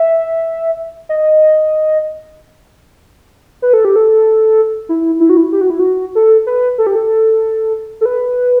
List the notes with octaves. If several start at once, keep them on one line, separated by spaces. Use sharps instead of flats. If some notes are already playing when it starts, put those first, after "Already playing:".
Already playing: E5
D#5
B4
A4
G4
A4
E4
E4
F#4
E4
G4
F#4
E4
F#4
A4
B4
A4
G4
A4
A4
B4